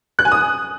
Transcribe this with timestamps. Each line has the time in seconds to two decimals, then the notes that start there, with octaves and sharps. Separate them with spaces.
0.19 F#6
0.25 G#5
0.32 D#6